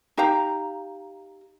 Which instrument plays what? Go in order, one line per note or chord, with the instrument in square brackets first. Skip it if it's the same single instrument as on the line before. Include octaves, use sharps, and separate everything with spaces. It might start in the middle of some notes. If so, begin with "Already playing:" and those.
[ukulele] D#4 G4 F5 A#5